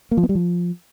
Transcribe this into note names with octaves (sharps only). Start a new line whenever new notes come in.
A#3
F3
B3
G3
F3